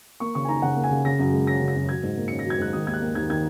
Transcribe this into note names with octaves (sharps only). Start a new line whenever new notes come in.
A#3 C#6
C#3 C#6
G#5
D#4 A#5
C#3 F#5
A#3
G#5
C#3
C#3 A#6
F#2
G#3
C#4 A#6
C#3
A#6
F#2
F#3 G#6
G#2
A#3
C#4 C#7
A#6
F#3
G#6
G#2 F#6
D#3 D#6
D#2 G#6
F#6
A#3
D#2 G#6
D#3 G#6